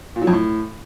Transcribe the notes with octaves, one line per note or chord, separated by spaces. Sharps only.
A#2
F#3
F2
A2